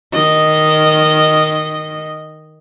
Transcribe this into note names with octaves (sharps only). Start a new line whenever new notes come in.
D#3 D#5